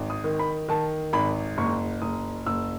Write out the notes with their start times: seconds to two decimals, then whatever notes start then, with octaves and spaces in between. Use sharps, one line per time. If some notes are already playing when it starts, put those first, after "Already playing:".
Already playing: G#1
0.10 D#6
0.24 D#3
0.39 B5
0.69 D#3 A5
1.13 G#1 B5
1.58 F#1 C#6
2.02 F#1 D#6
2.46 F#1 E6